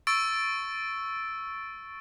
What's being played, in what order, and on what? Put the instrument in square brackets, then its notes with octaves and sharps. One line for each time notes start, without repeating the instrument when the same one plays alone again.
[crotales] C#6 E6 A6 D7